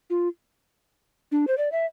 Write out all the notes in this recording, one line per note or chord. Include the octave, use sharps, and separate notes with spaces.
F4
D4
C5
D5
E5